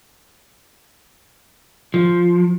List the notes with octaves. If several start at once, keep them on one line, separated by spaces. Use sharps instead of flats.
F3